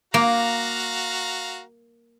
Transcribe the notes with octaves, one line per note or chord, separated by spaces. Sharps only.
A#3 F#4 F5 A#5